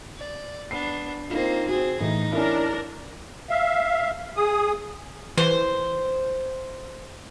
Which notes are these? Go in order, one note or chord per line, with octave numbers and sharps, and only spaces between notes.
D5
B3 D4 C7
A#3 C4 D#4 F4
C4 F#4 G#4
A2 E3 D#4
C#4 D4 E4 A#4
E5 F5
G#4 D#6
E3 C5